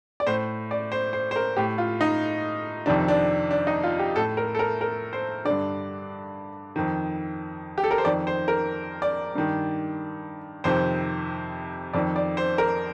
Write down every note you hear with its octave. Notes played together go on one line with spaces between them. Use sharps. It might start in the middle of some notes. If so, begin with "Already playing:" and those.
D5
A2 C5
D5
C5
C5
C5
A#4
A2 G4
F4
D#4
F2 C3 D#3 D4
D4
D4
D#4
F4
G4
A2 A4
A#4
A4
A#4
A#4
C5
G2 D3 D5
F2 D#3
G4
A4
A#4
C5
F2 D#3 D5
C5
A#4
D5
G2 D#3
F2 C3 D#3 C5
F2 D#3 D5
D5
C5
A#4